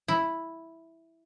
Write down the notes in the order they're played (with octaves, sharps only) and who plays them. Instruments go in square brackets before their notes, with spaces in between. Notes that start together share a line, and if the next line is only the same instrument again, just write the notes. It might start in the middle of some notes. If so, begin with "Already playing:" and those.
[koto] E4